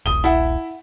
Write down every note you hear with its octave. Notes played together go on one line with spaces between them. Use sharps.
D#1 A#1 D#6 G7
E4 F#5 A5